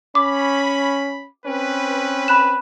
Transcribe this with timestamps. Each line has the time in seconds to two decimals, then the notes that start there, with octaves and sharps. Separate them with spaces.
0.15 C#4 B5 D6
1.45 C4 C#4 B4
2.28 B5 F#6 E7